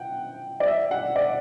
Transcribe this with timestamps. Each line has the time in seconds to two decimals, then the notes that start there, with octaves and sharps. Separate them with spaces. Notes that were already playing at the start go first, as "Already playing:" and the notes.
Already playing: F#5 G5
0.60 D5
0.67 E5
0.91 F#5
1.16 D5